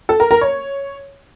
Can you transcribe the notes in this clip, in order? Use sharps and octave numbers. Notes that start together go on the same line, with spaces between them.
A4
A#4
A#4
C#5